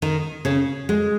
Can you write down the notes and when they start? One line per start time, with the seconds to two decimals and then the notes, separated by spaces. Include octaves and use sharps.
0.02 D#3 D#4
0.45 C#3 C#4
0.89 G#3